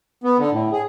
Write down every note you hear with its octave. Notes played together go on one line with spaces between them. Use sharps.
B3
D3
A2
G#4